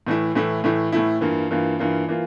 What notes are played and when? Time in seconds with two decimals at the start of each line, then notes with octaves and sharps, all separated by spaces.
0.07 A2 E3 A3 E4
0.35 A2 E3 A3 E4
0.64 A2 E3 A3 E4
0.92 A2 E3 A3 E4
1.21 G2 E3 A#3 F4
1.51 G2 E3 A#3 F4
1.79 G2 E3 A#3 F4
2.09 E3 A#3 F4